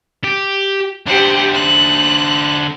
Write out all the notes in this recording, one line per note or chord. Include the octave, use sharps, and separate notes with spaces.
G4
D3 G4 C5 F#5
F#6